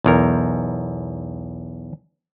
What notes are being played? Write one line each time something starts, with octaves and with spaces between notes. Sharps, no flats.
B1 E2 A#4